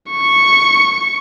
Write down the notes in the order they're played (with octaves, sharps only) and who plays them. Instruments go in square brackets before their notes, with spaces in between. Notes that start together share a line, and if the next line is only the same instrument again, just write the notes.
[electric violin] C#6